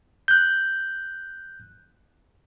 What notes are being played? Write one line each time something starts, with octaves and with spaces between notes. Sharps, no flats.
F#6 G6